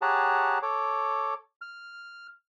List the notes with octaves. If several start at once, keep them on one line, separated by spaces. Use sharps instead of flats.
G4 G#4 C#5 F#5 A5 A#5
A4 C#5 D6
F6